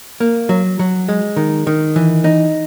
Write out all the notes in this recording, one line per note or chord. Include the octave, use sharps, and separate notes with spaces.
A#3
F#3
F#3
G#3
D#3
D#3
E3
D#4